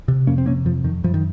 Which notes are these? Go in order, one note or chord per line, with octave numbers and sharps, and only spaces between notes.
C3
F2 A#3 C#4
C4
C3 A#3 C#4
F2 F3
F2 D#3
F#2 F3
D#3